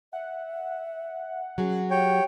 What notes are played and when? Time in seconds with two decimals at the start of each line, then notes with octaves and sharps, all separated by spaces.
0.13 E5 F#5
1.58 F#3 C#4 F#4 G#4
1.91 G4 C#5 G5